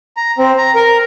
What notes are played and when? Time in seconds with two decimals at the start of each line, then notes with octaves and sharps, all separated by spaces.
0.17 A#5
0.38 C4
0.58 A#5
0.75 A#4